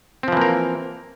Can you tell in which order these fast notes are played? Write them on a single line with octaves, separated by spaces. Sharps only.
C4 F3 E3 A#3 A#4